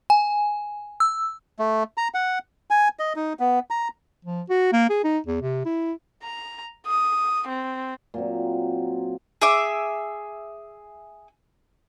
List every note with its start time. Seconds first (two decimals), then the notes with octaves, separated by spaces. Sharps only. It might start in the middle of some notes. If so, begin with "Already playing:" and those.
0.10 G#5
1.00 E6
1.59 A3
1.97 A#5
2.14 F#5
2.71 G#5
2.99 D#5
3.16 D#4
3.40 B3
3.70 A#5
4.25 F3
4.50 F#4
4.72 A#3
4.90 G#4
5.04 D#4
5.27 E2
5.42 C3
5.65 E4
6.23 A#5
6.86 D#6
7.48 C4
8.14 A#2 F#3 C4
9.42 G#4 E5 D6